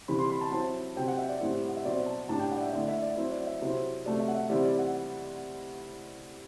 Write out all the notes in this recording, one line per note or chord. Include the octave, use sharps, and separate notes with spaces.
C3 E3 G3 B5
C6
B5
A5
F#3 C4 E4 A5
C3 F#3 C4 G5
F#5
E5
D5
A2 G3 C4 E4
F#5
E5
B2 F#3 C4 D5
D5
A5
A2 G3 D4 A5
G5
F#5
D5
E5
D3 A3 E4 D5
E5
D5
F#3 C4 E4 C5
D5
E5
C3 F#3 C4 E4
C3 F#3 A3 D5
E5
F#5
E5
C3 E3 G3 C4 E4 D5
D5
F#5